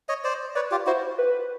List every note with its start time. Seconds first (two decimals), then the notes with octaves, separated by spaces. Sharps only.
0.09 C#5 D#5
0.24 C5 D5
0.55 B4 C#5 D5
0.71 F4 G4
0.87 E4 F#4 C5
1.18 B4